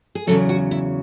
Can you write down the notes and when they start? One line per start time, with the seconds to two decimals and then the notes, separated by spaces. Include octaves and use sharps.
0.15 G#4
0.27 E2 C#3 F#3 A4
0.49 F#4
0.71 E4